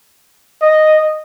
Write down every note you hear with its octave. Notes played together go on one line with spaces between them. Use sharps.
D#5